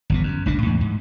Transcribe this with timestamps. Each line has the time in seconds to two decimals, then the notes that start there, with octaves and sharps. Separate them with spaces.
0.10 G1 E2 B2
0.23 F#2
0.46 F#1 C#2 A#2 D4
0.62 E2 A2
0.81 G#2